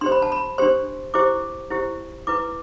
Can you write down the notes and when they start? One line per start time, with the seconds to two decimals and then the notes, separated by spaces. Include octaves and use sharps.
0.01 D4 G4 C5 C6
0.12 B5
0.22 A5
0.32 B5
0.58 D4 G4 C5 C6
1.14 E4 G4 C5 D6
1.70 E4 G4 C5
2.27 E4 B4 D6